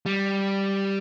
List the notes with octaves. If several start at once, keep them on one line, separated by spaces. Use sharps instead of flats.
G3